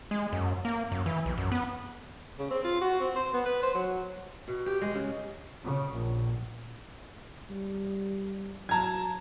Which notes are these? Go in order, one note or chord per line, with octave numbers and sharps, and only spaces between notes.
G#3
F#2
A#3
F#2
E3
B1
F#2
B3
C#3
C4
F4
F#4
C4
C5
B3
B4
C5
F#3
B2
G4
G#3
C#3
C#3
A#1
G3
F#3 A5 A#5 G#6